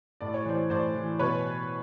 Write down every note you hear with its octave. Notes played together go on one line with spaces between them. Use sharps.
A2 D5
C#5
E3 C5 D5
A2 C5 D5
E3
B2 B4 C#5